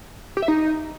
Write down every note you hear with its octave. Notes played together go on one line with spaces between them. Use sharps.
G4
E5
D#4